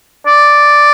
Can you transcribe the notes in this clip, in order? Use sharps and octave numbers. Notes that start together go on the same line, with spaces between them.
D5